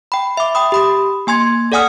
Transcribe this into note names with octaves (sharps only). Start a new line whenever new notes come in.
G5 B5
E5 D6
G5 B5 D#6
G4 B5 D#6
A#3 G#5 C6 G#6
A4 D5 F#5 G#5 D#6 F6